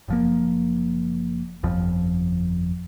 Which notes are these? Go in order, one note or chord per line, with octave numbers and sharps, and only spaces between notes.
F#1 F3 A#3
G1 F2 F3